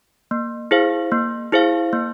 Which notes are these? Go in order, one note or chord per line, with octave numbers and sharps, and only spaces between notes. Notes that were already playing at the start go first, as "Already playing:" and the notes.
A#3
E4 G#4 C5 F5
A#3
E4 G#4 C5 F5
A#3